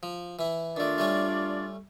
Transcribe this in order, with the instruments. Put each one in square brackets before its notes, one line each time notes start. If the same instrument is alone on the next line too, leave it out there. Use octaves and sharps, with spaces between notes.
[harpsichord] F3
E3 E4
[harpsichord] D#3 A3 [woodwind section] D4 F4 D5
[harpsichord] G3 A3 C#4